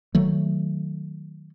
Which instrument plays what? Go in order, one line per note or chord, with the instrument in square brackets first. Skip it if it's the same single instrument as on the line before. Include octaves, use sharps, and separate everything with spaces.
[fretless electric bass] D#3 F#3 A3